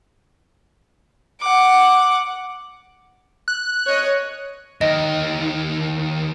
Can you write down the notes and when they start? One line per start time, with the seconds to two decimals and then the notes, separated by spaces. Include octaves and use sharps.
1.41 F#5 D6
3.48 F#6
3.87 C#5 D#5
4.81 D#2 D#3 D#5